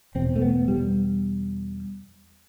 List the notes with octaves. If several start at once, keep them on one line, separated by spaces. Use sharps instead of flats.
E2 B2 C4
A3
B3
G3